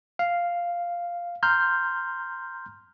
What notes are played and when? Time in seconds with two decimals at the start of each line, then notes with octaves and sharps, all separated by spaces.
0.19 F5
1.43 A#5 C6 F6 G6